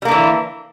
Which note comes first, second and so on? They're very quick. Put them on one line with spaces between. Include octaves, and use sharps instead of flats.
G3 A#3 D3 E3